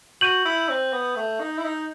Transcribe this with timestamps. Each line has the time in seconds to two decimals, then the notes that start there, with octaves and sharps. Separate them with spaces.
0.21 F#4 G6 D#7 F#7
0.46 E4
0.69 C4
0.93 B3
1.16 A3
1.40 D#4
1.58 E4
1.64 D#4